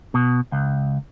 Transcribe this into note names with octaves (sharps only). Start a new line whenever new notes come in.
B2
C#2